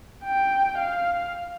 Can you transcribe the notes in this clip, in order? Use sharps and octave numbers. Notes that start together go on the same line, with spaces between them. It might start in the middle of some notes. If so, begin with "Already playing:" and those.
G5
F5